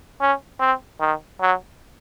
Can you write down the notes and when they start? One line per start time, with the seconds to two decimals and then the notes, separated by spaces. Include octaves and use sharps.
0.21 C#4
0.60 C4
1.00 D#3
1.41 F#3